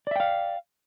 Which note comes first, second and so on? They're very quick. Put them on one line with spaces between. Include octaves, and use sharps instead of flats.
D5 E5 G5 F5